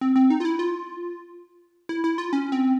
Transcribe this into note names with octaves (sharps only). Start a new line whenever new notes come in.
C4
C4
D#4
F4
E4
F4
E4
E4
F4
C#4
C4